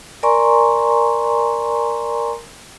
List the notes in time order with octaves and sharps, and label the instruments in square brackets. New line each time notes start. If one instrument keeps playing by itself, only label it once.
[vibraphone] A#4 D5 G#5 A#5 C6 C#6